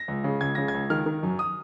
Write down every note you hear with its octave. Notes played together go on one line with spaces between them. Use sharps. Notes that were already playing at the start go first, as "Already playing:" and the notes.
Already playing: A#6
C#2
C#3
C#2 G#6
C#3 A#6
G#6
C#2
D#3 F6
D#3
F#2
D#6